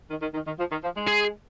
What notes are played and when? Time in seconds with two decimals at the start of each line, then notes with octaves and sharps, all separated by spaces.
0.09 D#3
0.21 D#3
0.33 D#3
0.46 D#3
0.58 F3
0.71 D#3
0.83 F3
0.95 G#3
1.08 G#4